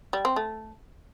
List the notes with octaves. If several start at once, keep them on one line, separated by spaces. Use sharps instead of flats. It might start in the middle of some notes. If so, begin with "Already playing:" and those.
G3
C4
A3